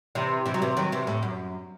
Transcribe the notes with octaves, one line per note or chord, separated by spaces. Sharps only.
C3 E3
C3 E3
F#3
C3 E3
D#3 F#3
C3 E3
A2
F#2